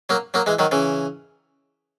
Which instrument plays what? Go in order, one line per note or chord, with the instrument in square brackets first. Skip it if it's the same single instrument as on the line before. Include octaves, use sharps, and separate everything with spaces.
[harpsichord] F#3 A#3
F#3 A#3
E3 G#3
D#3 F#3
C#3 E3